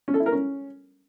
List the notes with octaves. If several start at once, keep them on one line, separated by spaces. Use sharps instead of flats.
C#4
A4
E4
A#4
C#4